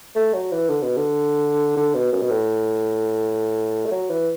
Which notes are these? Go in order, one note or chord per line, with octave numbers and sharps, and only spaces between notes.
A3
F#3
E3
D3
B2
D3
D3
B2
F#2
B2
A2
A3
F#3
E3